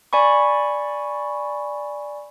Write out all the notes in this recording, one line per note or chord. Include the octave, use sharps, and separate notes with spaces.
D5 G#5 B5 C#6